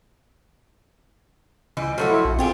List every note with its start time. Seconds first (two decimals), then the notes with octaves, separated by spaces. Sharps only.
1.77 C#2 E3 G3 D#5
1.98 F3 F#3 A3 F#4
2.10 E4
2.25 A#1
2.39 C4 F4 G4 G#4